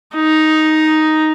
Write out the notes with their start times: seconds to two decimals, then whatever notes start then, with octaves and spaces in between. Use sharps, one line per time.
0.16 D#4